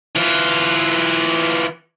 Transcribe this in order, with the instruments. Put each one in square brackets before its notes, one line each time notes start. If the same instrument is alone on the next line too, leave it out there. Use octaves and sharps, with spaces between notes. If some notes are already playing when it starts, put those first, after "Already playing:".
[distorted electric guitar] E3 F4